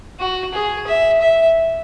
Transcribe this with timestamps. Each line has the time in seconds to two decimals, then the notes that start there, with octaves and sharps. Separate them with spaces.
0.20 F#4
0.54 G#4
0.87 E5
1.21 E5